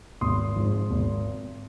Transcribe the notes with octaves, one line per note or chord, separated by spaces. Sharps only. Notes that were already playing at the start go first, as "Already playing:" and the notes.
G#1 C6 D#6
G#2 F3
G#1